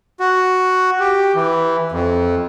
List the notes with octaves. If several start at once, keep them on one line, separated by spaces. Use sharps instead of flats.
F#4
G4
E3
F2